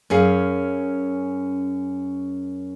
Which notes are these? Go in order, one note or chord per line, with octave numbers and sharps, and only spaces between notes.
F#2 C#4 G#4 F5